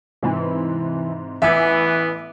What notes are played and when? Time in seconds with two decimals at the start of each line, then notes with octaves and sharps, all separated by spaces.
0.23 G#2 C3 E3
1.42 A1 E3 B3 E4 E5 G#5 D6